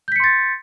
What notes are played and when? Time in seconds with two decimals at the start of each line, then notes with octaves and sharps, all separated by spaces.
0.08 G6
0.12 B6
0.16 C#7
0.20 C6
0.24 A6